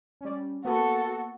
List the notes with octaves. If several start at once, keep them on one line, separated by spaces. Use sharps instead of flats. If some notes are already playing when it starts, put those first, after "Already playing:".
G3 C#4
A#3 B3 F#4 A4